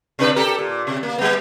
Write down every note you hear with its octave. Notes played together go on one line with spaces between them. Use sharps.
C3 D4 B4
G4 A4 A#4
A#2
C3
A#3
G3 B3